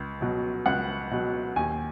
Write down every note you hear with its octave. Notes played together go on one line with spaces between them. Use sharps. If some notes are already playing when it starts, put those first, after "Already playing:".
Already playing: C#2
B2 F#3
C#2 F#5
B2 F#3
D#2 G#5